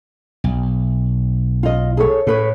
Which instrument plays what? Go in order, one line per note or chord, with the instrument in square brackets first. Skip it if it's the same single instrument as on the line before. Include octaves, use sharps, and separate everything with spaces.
[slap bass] B1
[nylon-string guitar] F4 D#5
G#4 A4 C#5
[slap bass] A2 [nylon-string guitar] A4 B4 C#5